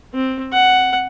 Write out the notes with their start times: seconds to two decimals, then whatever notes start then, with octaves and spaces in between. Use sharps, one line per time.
0.14 C4
0.53 F#5